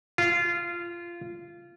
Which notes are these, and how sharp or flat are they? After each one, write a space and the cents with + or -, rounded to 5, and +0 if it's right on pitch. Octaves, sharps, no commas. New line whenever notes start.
F4 -20